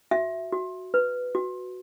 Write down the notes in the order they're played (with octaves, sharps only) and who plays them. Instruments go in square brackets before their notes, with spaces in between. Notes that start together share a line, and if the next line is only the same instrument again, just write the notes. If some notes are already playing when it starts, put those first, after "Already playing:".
[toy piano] F#4 E5
F#4
B4
F#4